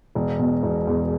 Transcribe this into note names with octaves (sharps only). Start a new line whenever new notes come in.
E1
B2
E1
E2